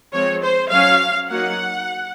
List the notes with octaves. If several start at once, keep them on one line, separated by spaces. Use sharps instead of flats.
F3 G#3 C4 C#5
C5
F#3 C#4 F5
F#3 A#3 D#4 F#5